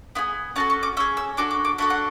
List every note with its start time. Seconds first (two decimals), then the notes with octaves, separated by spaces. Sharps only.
0.15 B3 E4 G#4
0.56 C#4 F#4 A4 A5
0.70 C#6
0.83 D6
0.97 C#4 E6
1.00 G#4
1.17 E6
1.37 D4 F#4 A4 D6
1.51 D6
1.65 D6
1.78 D4 F#4 A4 E5
1.90 F#5